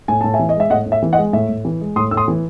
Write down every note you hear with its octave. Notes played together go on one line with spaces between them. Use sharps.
A2 G#5
A2 A5
E5 G#5
E3
D#5
G#3 E5
A2 D#5 F#5
A2
E5
E3
D#5 F#5
G#3
A2 E5
A2
E3
G#3
A2 C6 D#6
A2 E6
C6 D#6
E3